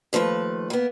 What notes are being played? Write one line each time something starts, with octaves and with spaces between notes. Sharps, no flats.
D#2 F3 A3 B4
A#3 B3